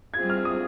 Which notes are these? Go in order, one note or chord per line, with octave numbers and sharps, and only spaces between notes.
G3 C4 F4 G#4 G#6
F6
D#6